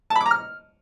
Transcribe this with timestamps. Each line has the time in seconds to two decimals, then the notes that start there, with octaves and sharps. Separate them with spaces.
0.10 A5
0.16 B5
0.21 D6
0.26 A#5
0.31 F6